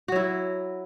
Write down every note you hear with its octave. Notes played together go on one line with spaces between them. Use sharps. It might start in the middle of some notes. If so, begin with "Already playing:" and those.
F#3 E4 F#4